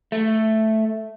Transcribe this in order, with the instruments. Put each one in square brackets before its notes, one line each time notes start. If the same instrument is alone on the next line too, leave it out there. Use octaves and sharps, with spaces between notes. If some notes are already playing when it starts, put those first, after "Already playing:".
[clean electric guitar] A3